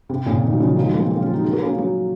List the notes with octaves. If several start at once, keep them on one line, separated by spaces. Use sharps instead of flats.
C3
A#2 C#3
C3 D#3
F#3
C#3 F3
D#3 F#3
F3 G#3
F#3 A#3
G#3 C4
A#3 C#4
C#4 F4
D#4 F#4
F4 G#4
F#4 A#4
A#3 C#4
F#3 A#3